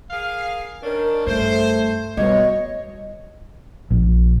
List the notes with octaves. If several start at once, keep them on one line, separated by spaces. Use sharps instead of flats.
G#4 A#4 F5
D#3 C#4 D4 A#4
G2 A3 C5
B2 G3 C#5 D#5
A#1